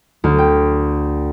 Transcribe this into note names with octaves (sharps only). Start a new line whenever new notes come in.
D2
G5